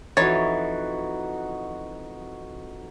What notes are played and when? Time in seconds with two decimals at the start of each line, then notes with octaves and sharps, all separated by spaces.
0.17 F2 E3 D#4 F#4 C#5 A6